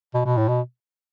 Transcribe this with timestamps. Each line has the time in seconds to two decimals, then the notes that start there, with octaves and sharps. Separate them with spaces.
0.14 B2
0.25 B2
0.37 A2
0.48 B2